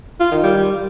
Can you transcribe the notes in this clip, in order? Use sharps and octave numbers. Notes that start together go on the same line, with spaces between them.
F4
D#3
G3